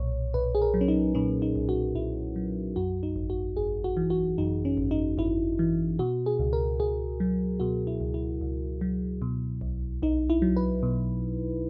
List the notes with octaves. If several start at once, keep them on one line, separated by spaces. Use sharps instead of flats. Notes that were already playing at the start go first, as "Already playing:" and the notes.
Already playing: B1 A#2 C#5
B1 B4
G#4
A#4
F#3
C#4
D#4
A#2 C#4
D#4
B1
F#4
B1 E4
F#3
F#2 F#4
D#4
G#1
F#4
G#1 G#4
F#4
E3
F#4
F#2 D#4
C#4
G#1
D#4
G#1 E4
E3
B2 F#4
G#4
C#2
A#4
C#2 G#4
F#3
B2 F#4
E4
C#2
E4
C#2
F#3
B2
B1
B1 D#4
E4
F#3
B4
B2